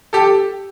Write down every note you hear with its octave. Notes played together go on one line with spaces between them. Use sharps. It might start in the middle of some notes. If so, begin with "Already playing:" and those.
G4 A4